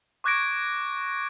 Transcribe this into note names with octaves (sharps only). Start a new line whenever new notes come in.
C#6 D6 F#6 G#6 A#6 D7